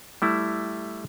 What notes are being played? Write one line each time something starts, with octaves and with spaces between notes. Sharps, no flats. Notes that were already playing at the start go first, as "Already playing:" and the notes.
G3 A3 E4